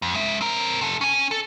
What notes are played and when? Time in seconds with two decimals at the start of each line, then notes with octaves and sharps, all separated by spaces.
0.02 F2
0.15 G#3 E5
0.41 C4 A#4
0.81 C3 A4
1.01 C#4 G#5
1.31 A4